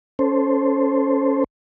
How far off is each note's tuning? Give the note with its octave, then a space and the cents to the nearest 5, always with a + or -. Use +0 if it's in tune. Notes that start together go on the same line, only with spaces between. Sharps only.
C#4 +0 A4 +0 C5 +0